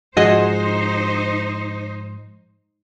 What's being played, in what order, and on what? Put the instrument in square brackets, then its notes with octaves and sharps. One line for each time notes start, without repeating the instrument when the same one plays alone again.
[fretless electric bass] G#2 F3 G#3 [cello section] D#4 C5 [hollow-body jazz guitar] F#4 G#4 D#5